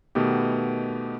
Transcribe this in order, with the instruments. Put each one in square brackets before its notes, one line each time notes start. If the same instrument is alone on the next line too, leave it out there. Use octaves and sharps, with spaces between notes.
[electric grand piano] B2 D#3 A3 B3 G4